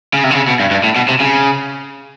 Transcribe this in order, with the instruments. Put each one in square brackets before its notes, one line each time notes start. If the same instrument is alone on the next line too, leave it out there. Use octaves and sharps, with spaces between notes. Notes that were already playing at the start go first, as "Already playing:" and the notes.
[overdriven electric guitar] C#3
C3
D3
C#3
B2
G2
G2
A2
B2
C3
C#3